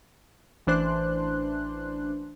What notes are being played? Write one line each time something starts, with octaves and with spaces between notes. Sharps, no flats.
A1 E3 D4 C5 C6 F#6